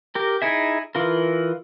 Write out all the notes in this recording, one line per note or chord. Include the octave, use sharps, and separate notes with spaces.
G4 A#4
D#4 E4 G#4 E5
E3 F4 A#4